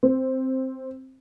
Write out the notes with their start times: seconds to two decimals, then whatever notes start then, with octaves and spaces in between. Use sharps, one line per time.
0.03 C4